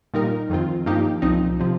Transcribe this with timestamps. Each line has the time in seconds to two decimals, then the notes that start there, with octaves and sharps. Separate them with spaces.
0.14 A#2 G3 D#4 A#4
0.49 F2 D#3 C4 F4
0.86 G2 F3 A#3 D#4 G4
1.22 C2 A#2 F3 C4 D#4
1.59 C3 F3